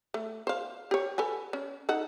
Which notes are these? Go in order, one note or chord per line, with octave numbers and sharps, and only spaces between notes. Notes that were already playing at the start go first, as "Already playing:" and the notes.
A3
C5 F5
G4 C#5
A4 B4 G#5
C#4
D#4 A4 F#5